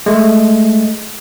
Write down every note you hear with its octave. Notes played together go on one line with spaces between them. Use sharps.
G#3 A3